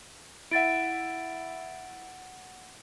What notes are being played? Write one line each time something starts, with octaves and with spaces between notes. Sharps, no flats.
E4 E5 F#5 A6 D7